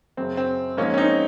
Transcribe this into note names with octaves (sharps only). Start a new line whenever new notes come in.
F#2 C#3 F#3 C4
C4
G#2 F3 A#3 C#4
C#4
C4 D#4